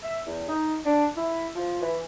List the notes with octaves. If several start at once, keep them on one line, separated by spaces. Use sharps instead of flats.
E5
E2
D#4
D4
E4
F3
E3